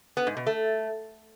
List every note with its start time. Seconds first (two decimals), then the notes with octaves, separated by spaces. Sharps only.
0.17 B3
0.27 G#2
0.37 B2
0.47 A3